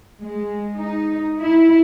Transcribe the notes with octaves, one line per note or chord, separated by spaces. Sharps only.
G#3
D#4
E4